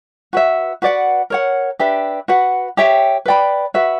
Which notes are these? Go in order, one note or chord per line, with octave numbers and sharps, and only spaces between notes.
F#4 B4 E5
F#4 B4 D5 F#5
A#4 C#5 F#5
D4 G4 B4 E5
F#4 B4 F#5
G4 C#5 E5 G5
B4 D5 G5 B5
F#4 B4 E5